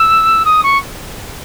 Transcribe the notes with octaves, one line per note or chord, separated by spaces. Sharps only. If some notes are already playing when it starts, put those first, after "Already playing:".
Already playing: E6
D#6
C#6